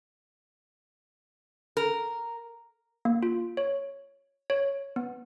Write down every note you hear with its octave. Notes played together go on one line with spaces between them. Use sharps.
A#4
A#3
F4
C#5
C#5
B3